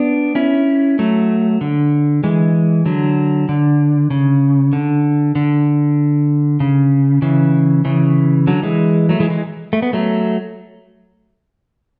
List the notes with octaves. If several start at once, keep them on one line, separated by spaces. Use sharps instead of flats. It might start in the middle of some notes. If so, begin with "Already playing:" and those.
Already playing: B3 D4
C#4 E4
F#3 A3
D3
E3 G#3
D3 F#3
D3
C#3
D3
D3
C#3
C#3 E3
C#3 E3
D3 F#3
E3 G#3
F#3 A3
E3 G#3
E3 G#3
A3
B3
F#3 A3